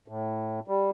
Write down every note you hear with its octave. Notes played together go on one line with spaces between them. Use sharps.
A2
G3